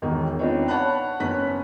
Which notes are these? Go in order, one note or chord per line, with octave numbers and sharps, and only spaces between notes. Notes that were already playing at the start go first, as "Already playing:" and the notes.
E1 B2 D#3
C4 D4 D#4 F4 B4 C#5
C#5 F#5 A5 B5 F#6
F#1 B3 C#4 F#6 B6